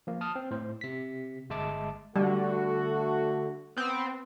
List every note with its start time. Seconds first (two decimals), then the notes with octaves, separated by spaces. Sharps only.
0.07 F3 A#3
0.21 A5 D#6 F6
0.36 C4
0.51 A2 C5
0.81 C3 B6
1.50 G1 G#3 E5 A5 D6
2.16 D3 G3 A3 F#4
3.77 B3 C4